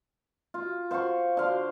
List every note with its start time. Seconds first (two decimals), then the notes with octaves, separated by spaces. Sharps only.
0.54 F4
0.91 C5 F5 F#5 C#6
1.37 D3 F5 C6